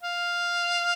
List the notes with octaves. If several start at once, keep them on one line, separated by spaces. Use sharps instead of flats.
F5